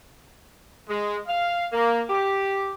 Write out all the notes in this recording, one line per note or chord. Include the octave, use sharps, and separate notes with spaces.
G#3
F5
A#3
G4